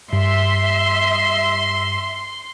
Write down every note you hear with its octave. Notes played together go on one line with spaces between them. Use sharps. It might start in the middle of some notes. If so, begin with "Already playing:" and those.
G2 E5 C6